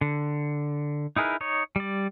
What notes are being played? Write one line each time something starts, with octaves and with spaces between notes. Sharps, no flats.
D3
D#4 E4 G#4 A#4 B4
D#4 C#5
G3 D5